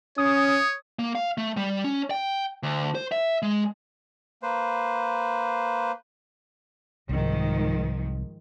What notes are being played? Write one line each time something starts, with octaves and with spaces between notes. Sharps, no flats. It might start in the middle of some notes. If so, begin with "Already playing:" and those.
C#4 C#5 D#6
A#3
F5
A3
G3
C#4
G5
D2
C5
E5
G#3
A#3 B4 C5
C2 G#2 D#3 F3